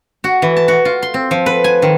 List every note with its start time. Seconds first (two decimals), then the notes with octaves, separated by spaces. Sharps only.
0.24 F#4
0.42 E3
0.57 A5
0.68 F#4
0.85 F4
1.02 C6
1.14 C4
1.31 F3
1.46 B4
1.64 G#5
1.82 D#3